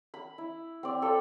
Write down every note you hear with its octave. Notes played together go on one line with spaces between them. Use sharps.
B5
E4
C4 D5
F4 A4 D5 G5